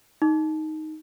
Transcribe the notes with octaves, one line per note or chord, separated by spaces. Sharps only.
D#4